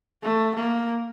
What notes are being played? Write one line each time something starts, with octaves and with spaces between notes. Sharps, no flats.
A3
A#3